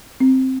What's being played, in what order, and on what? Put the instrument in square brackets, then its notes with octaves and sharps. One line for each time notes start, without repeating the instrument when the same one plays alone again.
[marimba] C4